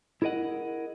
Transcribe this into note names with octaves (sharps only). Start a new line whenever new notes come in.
E4 G#4 A#4 D#5 F#5